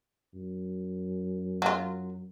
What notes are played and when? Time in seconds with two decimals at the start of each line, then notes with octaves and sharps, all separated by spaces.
0.34 F#2
1.62 F#3 F4